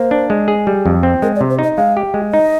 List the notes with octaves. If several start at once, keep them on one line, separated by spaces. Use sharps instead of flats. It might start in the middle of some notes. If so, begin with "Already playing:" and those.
Already playing: A#3 C5
D4
G#3
G#4
G3
F2
C4
G#3 A#4
D5
C3
C5
D#4 D#5
G#3 F5
G4
G#3
D#4 D#5